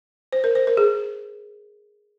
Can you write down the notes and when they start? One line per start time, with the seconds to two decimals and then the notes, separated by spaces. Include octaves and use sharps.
0.33 C5
0.44 A#4
0.55 C5
0.67 A#4
0.77 G#4